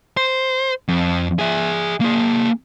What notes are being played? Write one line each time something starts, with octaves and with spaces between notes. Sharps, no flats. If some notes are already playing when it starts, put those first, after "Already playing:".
C5
F2
G#4 E5
A#3 G#4